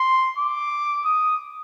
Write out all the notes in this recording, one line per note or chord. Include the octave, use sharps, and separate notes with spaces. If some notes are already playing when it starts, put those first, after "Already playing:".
Already playing: C6
D6
D#6